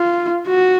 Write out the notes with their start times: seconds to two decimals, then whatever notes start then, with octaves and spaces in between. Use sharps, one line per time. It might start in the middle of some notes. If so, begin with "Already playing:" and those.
Already playing: F4
0.47 F#4